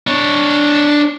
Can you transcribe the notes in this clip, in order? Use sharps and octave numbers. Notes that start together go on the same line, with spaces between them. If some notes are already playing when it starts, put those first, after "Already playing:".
D4 C#5